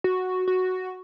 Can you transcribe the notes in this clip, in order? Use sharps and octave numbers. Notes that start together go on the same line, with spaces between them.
F#4
F#4